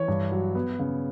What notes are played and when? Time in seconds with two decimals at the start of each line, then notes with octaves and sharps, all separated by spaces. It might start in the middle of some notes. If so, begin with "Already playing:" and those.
Already playing: E3 C#5
0.08 G2
0.32 F#3
0.55 B3
0.79 C#3